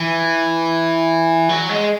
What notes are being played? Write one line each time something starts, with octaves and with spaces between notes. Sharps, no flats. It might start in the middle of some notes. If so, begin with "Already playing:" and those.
Already playing: E3
F#3
G#3